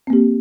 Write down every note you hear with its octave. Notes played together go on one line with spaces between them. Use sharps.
A#3 C4 G4